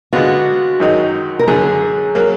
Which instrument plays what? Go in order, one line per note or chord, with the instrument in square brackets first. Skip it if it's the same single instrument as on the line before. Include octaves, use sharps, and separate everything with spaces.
[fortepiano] D3 G#3 B3 F4 [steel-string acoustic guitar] F#4
[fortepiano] F#2 D#3 G#3 D#4
[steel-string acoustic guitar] A#4
[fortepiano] F#2 D3 F#3 [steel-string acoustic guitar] G#4
[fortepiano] F#3 A#3